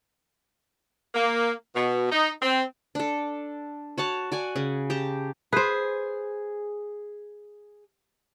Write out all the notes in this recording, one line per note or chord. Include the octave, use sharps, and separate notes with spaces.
A#3
B2
D#4
C4
D4 A4
F#4 C#5 A5
F#4 D5 G#5
C#3
G4 A5 A#5
G#4 B4 C5